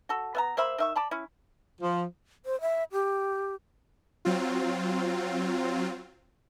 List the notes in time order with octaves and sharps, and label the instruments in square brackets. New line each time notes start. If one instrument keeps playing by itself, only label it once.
[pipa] F#4 A4
B3 E5 A#5
A#3 C5 E5 B5
D#3 E5 C#6
D5 A5 B5
C#4 E4
[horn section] F3
[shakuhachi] C5
E5
G4
[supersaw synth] F#3 C4 F4